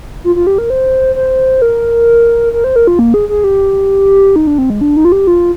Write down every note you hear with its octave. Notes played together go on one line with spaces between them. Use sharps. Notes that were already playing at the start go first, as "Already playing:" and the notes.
F4
F4
G4
A#4
C5
C5
A#4
A#4
C5
A#4
F4
A#3
G#4
G#4
G4
D#4
D4
C4
G#3
D4
D#4
F4
G4
F4